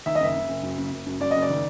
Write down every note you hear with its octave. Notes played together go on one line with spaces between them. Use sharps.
D#3 E5
D#5
F#1 E5
F#1
F#1
F#2
F#1
F#1
F#2
F#2 D5
F#1 D#5
D5
D#3